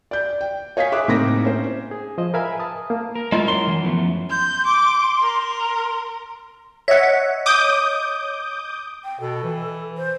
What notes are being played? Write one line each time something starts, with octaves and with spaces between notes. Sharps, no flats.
D5 G6
G5
C#5 D#5 F5 G#5 B6
G#4 E5 D6 F#6
A2 A#3 C4 D#4 D6 A#6
C#4 C5
G#4
F3 C5 D#5
A#4 B4 E5 F5 G#5 B5
A5 D#6
A#3
A#4
G#3 E4 F4
F#2 C6
E3
F3 A3 B3
C6 G6
D6
A#4
C#5 D#5 E5 F#5
D6 D#6 G6
G5
B2 A4
E3
C5